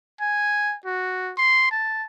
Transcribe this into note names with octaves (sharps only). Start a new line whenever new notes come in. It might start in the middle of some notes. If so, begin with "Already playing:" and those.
G#5
F#4
C6
A5